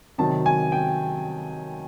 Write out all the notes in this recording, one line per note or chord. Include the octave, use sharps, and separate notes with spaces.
C3 D#3 F#3 A5
G#5
G5